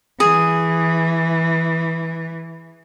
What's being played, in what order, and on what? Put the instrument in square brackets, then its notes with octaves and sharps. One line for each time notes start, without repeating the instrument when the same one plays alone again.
[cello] E3 [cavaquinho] G#4